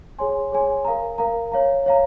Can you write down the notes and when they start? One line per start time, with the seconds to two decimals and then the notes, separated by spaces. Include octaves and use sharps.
0.19 G#4 C#5 G#5 C6
0.52 G#4 C#5 G#5 C6
0.85 A#4 F5 A#5
1.18 A#4 F5 A#5
1.52 C#5 F5 A#5
1.86 C#5 F5 A#5